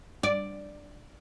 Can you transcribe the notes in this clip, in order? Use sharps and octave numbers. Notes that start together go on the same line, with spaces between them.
D5